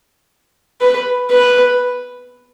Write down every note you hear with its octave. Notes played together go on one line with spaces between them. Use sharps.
B4
B4